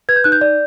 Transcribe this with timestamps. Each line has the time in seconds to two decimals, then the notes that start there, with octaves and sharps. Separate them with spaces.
0.09 B4 G#6
0.16 G6
0.24 D#4 F#6
0.32 G6
0.41 D5